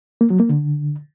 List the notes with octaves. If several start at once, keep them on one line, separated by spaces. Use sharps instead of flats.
A#3
F#3
A#3
D3